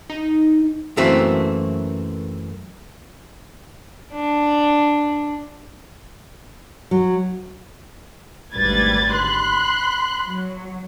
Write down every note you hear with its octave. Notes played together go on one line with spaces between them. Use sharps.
D#4
F#2 E3 A3 A#3 C4 F#4
D4
F#3
G#1 D2 G3 B4 G#6 A6
B5 C6 F#6
F#3